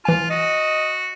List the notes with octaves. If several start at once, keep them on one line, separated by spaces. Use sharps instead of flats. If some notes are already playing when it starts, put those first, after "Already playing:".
E3 F4 G#5
F#4 D#5